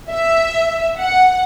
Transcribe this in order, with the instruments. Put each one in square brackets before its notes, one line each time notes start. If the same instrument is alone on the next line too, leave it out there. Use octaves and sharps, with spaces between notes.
[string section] E5
F#5